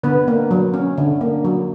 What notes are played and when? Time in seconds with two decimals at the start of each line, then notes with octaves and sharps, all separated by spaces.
0.03 D3 B3 B4
0.28 A#3
0.51 F#3
0.74 C#4
0.98 D3
1.21 A#3
1.44 F#3